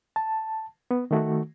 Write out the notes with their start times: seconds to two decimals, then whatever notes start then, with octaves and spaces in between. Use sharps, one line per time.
0.16 A5
0.91 B3
1.11 D#3 A3 F#4